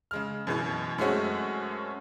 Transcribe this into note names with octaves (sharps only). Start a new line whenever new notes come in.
C#3 G#3 F6
F#2 B2 E3
F#2 G#3 A3 C4 C#4 F#4